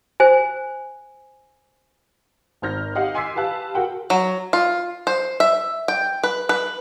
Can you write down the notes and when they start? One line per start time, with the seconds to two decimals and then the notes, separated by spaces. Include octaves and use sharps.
0.20 C5 G#5
2.62 G#1 C5 F6 G6 A#6
2.95 G4 D#5 F5 F#5
3.15 G#5 C6 D6 E6 B6 C7
3.36 G4 B4 F5 A5 F#6
3.75 F#4 G#4 A#4 F#5 G5
4.10 F#3
4.53 F4
5.07 C5
5.40 E5
5.88 G5
6.24 B4
6.49 B4